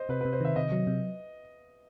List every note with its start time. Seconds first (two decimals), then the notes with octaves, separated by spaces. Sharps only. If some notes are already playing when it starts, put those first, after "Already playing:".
Already playing: C5 D#5
0.09 C3 B4
0.21 C3 B4
0.33 C5
0.41 D#3 E5
0.56 C3 D#5
0.72 F#3
0.87 C3